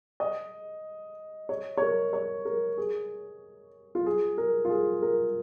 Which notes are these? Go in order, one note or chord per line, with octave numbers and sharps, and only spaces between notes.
D#5
C#5
C#5
A#4
C#5
A#4
G#4
F4
G#4
A#4
F4
G#4
A#4